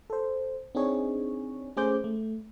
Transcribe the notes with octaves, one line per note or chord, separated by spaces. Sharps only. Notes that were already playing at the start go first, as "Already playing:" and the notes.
A4 C5
C4 D4 D#4 G#4 C#5
A3 C#4 G#4 C5 D6 G6
A3